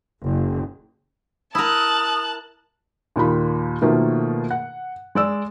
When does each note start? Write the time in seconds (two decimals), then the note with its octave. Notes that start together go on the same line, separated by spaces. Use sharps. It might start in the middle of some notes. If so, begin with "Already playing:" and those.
0.23 F#1
1.55 E4 A#4 A5 D#6 F#6
3.16 D#2 A#2 D#3 B5
3.82 B2 D#3 F3 A3 A#3
4.51 F#5
5.15 G#3 D5 E6